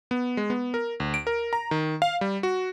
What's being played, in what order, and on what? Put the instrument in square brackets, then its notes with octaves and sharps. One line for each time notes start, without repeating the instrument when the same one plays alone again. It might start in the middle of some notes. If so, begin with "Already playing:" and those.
[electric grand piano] B3
G#3
B3
A#4
D2
D7
A#4
A#5
D#3
F5
G3
F#4